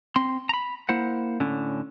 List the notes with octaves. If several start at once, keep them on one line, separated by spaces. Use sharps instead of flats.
C4 C6
A#5 B5
A#3 E4 C5 F#5
A2 D3 C#4